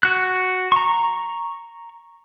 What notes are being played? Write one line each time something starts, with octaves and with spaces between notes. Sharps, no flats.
F#4 F#6
A#5 C#6